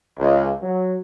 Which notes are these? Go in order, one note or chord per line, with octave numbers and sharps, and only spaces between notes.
C#2
F#3